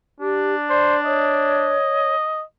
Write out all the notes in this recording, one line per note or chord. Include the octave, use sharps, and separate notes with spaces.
D4 G4
C5 D5
C#5 D#5